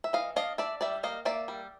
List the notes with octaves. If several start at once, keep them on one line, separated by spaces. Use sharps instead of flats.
E5
E3 D#5 F5
D4 D#5 F5
D4 D5 E5
G3 D5 E5
A#3 D#5 F5
A#3 D5 E5
G3